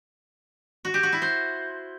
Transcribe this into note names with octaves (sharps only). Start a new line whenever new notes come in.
F#4
G4
F#4
E4
C5